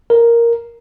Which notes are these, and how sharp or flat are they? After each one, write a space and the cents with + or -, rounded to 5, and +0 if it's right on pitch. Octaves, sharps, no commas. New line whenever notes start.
A#4 +0